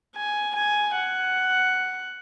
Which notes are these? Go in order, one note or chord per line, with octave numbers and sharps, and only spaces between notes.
G#5
G#5
F#5